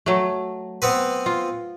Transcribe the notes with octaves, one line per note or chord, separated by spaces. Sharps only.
F#3 A3
B3 C4 B4
F4